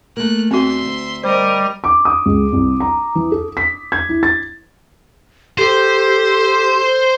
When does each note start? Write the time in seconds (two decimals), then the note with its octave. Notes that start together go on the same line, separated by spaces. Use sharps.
0.17 A3 A#3 F#6
0.51 E2 C4 D4 F#4 A4 E5 C6
0.85 D2
1.24 G3 A#4 C5 D#5
1.84 D6
2.05 D#6
2.26 C#2
2.52 C2
2.80 A#5
3.15 E3
3.32 A4
3.57 B6
3.92 G#6
4.09 E4
4.23 A6
5.58 G4 A4 C5